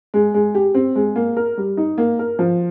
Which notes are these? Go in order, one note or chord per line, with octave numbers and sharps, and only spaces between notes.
G#3
G#3
G4
C4
G#3
A#3
A#4
G3
D#4
A#3
A#4
F3